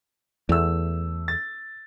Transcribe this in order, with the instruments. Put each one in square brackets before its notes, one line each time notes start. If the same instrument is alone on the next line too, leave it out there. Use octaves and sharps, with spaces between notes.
[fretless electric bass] E2 [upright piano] A3 E6
[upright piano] A6